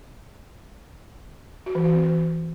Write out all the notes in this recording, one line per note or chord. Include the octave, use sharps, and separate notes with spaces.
F#4
E3
F#4
C4
E3